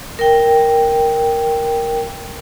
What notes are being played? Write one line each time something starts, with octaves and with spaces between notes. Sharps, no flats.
A#4 G5